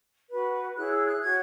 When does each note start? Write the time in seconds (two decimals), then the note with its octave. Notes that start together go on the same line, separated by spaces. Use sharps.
0.30 F#4 B4
0.76 E4 G#4 C#5 F#6
0.91 E6
1.06 F#6
1.21 F#4 C#5 G#6